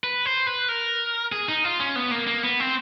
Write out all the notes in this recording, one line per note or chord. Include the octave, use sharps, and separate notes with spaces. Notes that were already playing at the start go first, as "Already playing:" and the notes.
B4
C5
B4
A#4
G#4
D#4
F4
C#4
B3
A#3
A#3
B3
C4